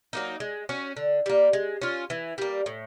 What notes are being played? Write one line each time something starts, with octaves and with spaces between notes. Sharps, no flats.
F#3 A#3 D#4
G#3
C#4 F#4
D3
G3 A#3
G#3
C#4 F4
E3
G3 A#3
A2